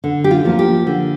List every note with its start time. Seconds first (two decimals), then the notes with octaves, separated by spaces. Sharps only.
0.04 D3
0.24 G4
0.31 F4
0.45 F3 A#3 F4
0.59 G4
0.87 D3